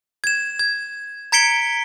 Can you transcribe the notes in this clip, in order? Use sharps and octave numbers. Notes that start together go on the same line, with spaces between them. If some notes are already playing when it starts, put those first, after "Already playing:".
G#6 E7
G#6
A#5 G#6 B6 C#7 D7 G7